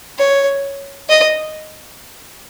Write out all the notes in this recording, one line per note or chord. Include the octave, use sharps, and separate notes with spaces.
C#5
D#5